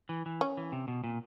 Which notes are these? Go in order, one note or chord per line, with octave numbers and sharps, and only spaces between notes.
E3
E3
C#4
E3
C3
B2
A#2